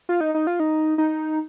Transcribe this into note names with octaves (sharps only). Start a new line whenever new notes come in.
F4
D#4
D#4
F4
D#4
D#4